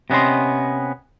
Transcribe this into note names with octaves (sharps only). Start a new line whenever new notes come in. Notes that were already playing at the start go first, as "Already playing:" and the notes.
C3 B3 C#4 D#5 C6